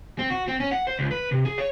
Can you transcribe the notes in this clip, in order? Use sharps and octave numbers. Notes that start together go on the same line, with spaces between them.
C4
F#4
C4
C#4
F#5
C5
C#2
B4
C3
G#4
C#5